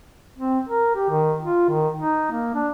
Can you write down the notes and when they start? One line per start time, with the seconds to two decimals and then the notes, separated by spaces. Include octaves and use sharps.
0.38 C4
0.69 A#4
0.95 G4
1.09 D#3
1.42 F4
1.70 D#3
1.98 D#4
2.32 A#3
2.55 D4